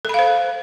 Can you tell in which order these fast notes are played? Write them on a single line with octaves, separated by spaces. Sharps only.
A4 B5 F5 C5